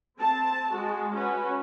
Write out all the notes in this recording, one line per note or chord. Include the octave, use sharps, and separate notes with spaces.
C4 A5
G#3 F#4
C#4 F#4 B4